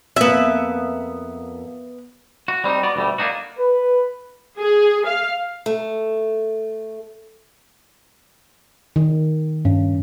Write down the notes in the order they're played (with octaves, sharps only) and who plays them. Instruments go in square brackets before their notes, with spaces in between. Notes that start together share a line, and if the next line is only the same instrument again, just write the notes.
[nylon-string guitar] F2 A#3 [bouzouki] B3 E5
[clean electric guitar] F#4
G3 C4 C#4 D#4
B3 F#4 D5
D2 B2 G3 A3
A#3 B3 D4 D#4 F#4
[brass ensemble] B4
[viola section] G#4
F5
[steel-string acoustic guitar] A3
[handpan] D#3
[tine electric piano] G2 [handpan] C#4